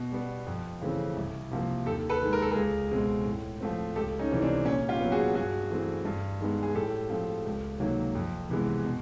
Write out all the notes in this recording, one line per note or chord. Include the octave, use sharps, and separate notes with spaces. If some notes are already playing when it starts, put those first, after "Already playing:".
Already playing: B2
G3 B3
F2
C#3 E3 A3 C4
C2
C3 F3 A#3
D#2 G4 A4
A4 B4
D#3 G#3
A#4
A4
C#2 G#4 A#4
B2 G#3 C4
A2
F3 A3 C4
C#2 G4 A4
C#4 D#4
C3 E3 G3 C4
C4 D4
A#2 C#4
F4 G4
F#3 B3
F#4 G#4
G2 F#4 G#4
E3 A3 C4
G2
D#3 G#3 B3
G#4
A2 G4 A4
F3 A3 C4
C#2
C3 D#3 F#3 A#3
F2
C3 E3 G#3 B3
B2